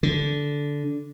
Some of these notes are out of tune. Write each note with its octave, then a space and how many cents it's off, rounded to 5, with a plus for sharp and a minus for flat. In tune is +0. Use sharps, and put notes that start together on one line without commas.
D3 -15